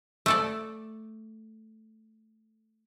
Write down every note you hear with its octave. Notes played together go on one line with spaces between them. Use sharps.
A3 A4 D5